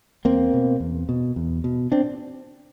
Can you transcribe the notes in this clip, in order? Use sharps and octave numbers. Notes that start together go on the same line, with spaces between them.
E2 A#3 C4
B2
E2
B2
E2
B2
C4 D4